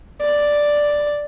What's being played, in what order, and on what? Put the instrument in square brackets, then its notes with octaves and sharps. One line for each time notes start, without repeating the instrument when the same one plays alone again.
[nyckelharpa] D5